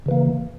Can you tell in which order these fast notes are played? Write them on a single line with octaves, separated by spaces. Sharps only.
C#3 E3 A#3